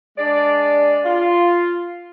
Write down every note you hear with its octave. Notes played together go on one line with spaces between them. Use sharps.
G#3 D4 D5
F4